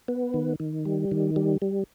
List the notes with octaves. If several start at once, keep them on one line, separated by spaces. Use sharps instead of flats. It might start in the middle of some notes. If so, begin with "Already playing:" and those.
B3
D#3
D#3
G3
D#3
G3
G3